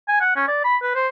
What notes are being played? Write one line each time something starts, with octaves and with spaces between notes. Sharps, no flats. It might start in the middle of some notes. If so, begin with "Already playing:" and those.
G#5
F#5
C#4
D5
B5
B4
C5